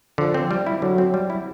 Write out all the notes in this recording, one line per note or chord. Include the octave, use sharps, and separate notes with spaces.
D3 F3
C4
G3
E4
D3 F#3
C4
G3
E4